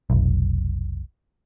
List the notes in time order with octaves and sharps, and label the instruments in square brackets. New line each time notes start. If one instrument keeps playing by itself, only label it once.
[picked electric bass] F1 B1